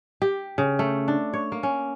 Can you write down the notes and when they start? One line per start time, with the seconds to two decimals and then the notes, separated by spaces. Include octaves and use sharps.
0.22 G4
0.58 C#3
0.79 A3
1.08 D4
1.33 C#5
1.52 A#3
1.63 C#4